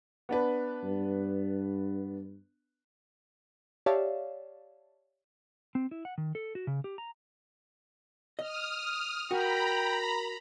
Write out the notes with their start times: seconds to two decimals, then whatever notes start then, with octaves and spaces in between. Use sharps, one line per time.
0.29 B3 D4 B4
0.84 G2
3.86 G4 C#5 D5 E5 F5 A5
5.75 C4
5.91 E4
6.05 F#5
6.18 D#3
6.35 A4
6.55 F#4
6.67 C#3
6.84 G4
6.98 A#5
8.39 D#5 D#6 F6
9.31 F#4 A#4 G5 A#5 B5